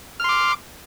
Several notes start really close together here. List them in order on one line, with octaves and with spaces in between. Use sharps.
F6 C6 D6